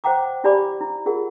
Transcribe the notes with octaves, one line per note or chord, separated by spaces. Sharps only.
C5 C#5 F#5 G5 A#5 D6
E4 G4 D5 G#5 B5 D6
E4
F4 G#4 A#4 F#5